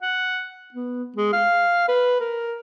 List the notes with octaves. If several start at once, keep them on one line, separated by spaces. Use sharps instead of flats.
F#5
B3
G#3
F5
B4
A#4